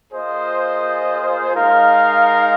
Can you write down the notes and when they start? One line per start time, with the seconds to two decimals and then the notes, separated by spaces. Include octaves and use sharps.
0.11 A#3 F4 G#4 C5 D#5
1.53 G#3 D#4 A#4 F5